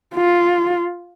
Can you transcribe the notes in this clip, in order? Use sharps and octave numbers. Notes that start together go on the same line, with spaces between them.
F4